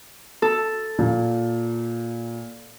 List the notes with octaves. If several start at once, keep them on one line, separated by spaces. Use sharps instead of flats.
A4
A#2